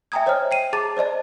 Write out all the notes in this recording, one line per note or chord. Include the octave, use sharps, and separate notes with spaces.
E5 G5 G#5 A#5 D#6 G#6
C5 C#5 D#5 G5 F6
G5 C7 D#7
G#4 A5 A#5 D6 A6
C5 D5 D#5 A5